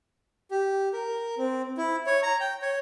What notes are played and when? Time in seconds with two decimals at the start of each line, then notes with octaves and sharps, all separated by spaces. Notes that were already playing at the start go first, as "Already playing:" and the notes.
0.51 G4
0.93 A#4
1.38 C4
1.77 E4
2.06 C#5
2.23 A#5
2.40 G5
2.62 C#5